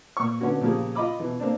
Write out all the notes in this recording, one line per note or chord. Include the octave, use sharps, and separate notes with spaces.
A#2 C#6
D3 B3 C#4 F#4
A#2 C#3 F3 A#3 G4 G#4
F4 D#5 B5 D6
B2 E3
A#3 C4 D4